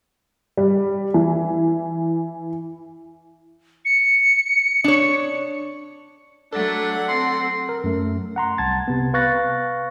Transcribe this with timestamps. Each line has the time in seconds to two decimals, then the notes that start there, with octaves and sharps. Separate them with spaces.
0.57 G3
1.14 E3
3.85 C#7
4.84 D4 C#5
6.52 F#3 A3 D4 A4 F#5
7.08 C4 C6
7.69 A#4
7.84 F#2 A3
8.36 F#5 A#5 C6
8.58 C2 A5 G#6 A6
8.88 C3 B3
9.14 B4 F5 C#6 F#6 A6 A#6